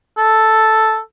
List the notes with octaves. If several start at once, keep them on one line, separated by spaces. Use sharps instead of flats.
A4